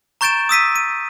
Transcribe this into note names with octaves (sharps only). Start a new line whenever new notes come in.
A#5 C#6 G6 A6 D7 E7
D#6 E6 B6 D#7
D#7